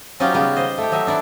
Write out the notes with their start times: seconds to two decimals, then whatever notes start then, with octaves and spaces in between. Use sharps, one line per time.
0.20 F#3 C#4 D#4 F4 G4
0.34 C#3 G3 B3 C#4 G4
0.56 C5 D#5
0.78 A3 G4
0.92 F#3 D#4 E5
1.07 D4 E4 D5